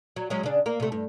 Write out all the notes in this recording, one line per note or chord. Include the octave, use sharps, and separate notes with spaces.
F#3
F#3 G#3 C#4
C#3 D4
A#3 A#4
C3 A3
G2